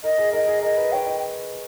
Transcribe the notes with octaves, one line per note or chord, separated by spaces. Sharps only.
A#4 D#5
G#4
A#4 D#5
G#4
A#4 D#5
B4
C#5 G5
D#5